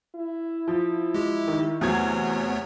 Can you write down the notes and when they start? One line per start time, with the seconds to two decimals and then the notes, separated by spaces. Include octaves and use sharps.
0.15 E4
0.68 F3
1.14 G#3 G4
1.48 D#3
1.81 E2 C3 F#3 A3 B3 C#5 G#6